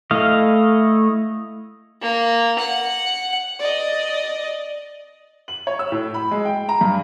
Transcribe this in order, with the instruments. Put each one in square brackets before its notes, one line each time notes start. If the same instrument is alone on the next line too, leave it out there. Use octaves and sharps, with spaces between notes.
[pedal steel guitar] A3 E4 D#5 F5
[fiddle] A#3
F#5
D5 D#5
[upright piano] F#7
C#5
E6
A2
B5
G#3
G5
A#5
G2